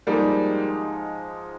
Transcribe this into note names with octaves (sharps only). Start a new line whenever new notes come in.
G#2 F3 G3 G#3 A#3 D#4